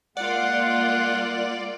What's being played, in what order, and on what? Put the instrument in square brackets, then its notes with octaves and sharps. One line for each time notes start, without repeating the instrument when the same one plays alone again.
[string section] G#3 A#3 F4 [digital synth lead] D5 [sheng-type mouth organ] F#5